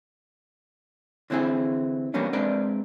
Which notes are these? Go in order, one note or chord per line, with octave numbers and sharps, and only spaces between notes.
D3 E3 C4 E4 G#4
E3 G3 A#3 B3 C#4 D4
G#3 C4 D4 A#4 B4 D5